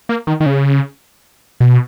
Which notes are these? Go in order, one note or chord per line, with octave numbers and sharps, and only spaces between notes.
A#3
D#3
D#3
C#3
B2